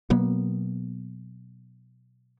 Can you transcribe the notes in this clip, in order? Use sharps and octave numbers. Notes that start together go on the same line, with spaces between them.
B2 F#3 A#3 B3